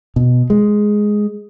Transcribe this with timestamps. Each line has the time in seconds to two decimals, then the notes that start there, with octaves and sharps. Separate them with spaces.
0.16 B2
0.50 G#3